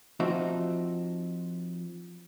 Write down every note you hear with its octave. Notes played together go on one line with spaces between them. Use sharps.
F3 C4 D#4 F#4 E5